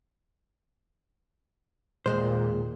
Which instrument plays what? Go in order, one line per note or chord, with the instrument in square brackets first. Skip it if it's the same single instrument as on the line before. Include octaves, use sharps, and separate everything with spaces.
[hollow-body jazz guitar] D#2 G#3 C5 [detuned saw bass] A#2